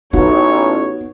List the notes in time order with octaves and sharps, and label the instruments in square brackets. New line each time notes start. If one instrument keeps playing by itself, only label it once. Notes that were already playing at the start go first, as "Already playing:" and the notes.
[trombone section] A1 [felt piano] B3 F#4 [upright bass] D#4 [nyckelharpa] C#5